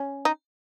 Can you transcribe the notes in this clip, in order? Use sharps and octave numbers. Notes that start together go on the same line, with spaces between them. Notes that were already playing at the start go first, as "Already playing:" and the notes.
Already playing: C#4
D#4